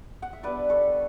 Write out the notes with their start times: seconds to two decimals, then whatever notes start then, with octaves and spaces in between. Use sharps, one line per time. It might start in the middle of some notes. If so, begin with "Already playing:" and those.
0.22 F#5
0.33 E5
0.43 G3 B3 D4 B4 D5
0.70 A4 C#5